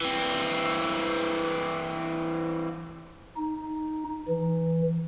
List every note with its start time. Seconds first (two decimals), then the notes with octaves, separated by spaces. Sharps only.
0.01 E3 C4
3.37 D#4
4.29 E3